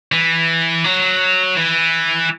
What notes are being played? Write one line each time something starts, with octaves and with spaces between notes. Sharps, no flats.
E3
F#3
E3